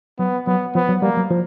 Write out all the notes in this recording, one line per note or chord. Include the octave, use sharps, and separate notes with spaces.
F#3 B3
F#3 B3
F3 B3
F#3
G3 A#3
F#3
F3